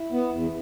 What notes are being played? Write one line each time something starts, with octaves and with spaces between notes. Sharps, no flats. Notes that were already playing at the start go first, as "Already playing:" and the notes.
Already playing: E4
B3
E2